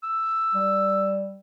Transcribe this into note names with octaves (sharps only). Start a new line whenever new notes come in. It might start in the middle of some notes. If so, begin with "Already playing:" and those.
E6
G3